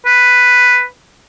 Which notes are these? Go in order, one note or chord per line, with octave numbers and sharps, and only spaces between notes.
B4